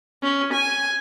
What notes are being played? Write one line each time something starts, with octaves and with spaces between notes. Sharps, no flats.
C#4
G#5